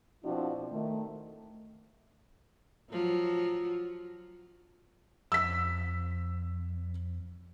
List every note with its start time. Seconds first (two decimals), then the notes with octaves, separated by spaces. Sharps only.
0.24 B2 F3 C4 D4 E4 F#4
0.72 D#3 A3
2.90 F3 F#3
5.32 F2 E6 B6